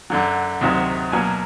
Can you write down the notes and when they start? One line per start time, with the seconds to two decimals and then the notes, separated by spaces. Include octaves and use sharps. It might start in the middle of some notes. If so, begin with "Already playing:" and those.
0.10 F#2 D3 F#3
0.61 D2 C3 D#3 F#3
1.12 B2 F#3 A#3 G#5